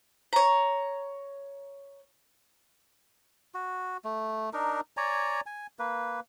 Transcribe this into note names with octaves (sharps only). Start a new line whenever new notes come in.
C#5 A#5
F#4
A3
D4 D#4 A#4
C#5 D5 G#5 A#5
G#5
A#3 B4